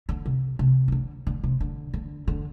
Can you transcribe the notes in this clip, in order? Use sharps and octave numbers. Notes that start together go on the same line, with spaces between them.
D3
C3
C3
D#3
D3
D3
C3
D3
D3
D3